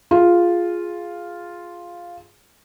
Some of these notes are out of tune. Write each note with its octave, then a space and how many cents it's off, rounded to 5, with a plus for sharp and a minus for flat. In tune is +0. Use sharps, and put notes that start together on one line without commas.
F4 +0 G#4 +0